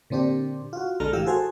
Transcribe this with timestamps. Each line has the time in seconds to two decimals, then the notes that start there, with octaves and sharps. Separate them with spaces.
0.10 A#2 D3 C4 D4 G4
0.73 F4 F#4
1.00 B1 D3 G#3 A4 A#5 F6
1.13 A2 E3 G4 F5 E6
1.26 F#4 G#4 A4 C5 G#5